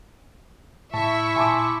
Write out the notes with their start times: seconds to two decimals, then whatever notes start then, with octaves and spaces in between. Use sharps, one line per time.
0.94 A2 E4 E5 A5 C#6
1.36 A#2 G#5 A5 C6 D6